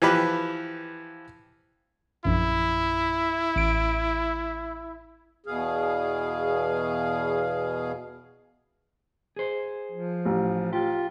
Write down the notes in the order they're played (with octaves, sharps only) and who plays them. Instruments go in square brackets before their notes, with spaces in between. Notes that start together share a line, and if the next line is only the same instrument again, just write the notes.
[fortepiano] E3 F3 G4 B4
[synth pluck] A#1 F#2 [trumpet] E4
[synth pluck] A1 D7
[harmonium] E2 B2 G#4 F5
[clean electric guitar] G#4 C5
[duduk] F3
[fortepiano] A1
[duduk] F4 [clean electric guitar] G4